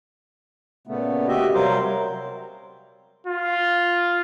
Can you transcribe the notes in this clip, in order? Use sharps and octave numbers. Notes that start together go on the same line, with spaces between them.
A#2 C#3 A3 B3
F#4 G4 D#5 E5
C3 F#3 G3 A#4 C5 F5
F4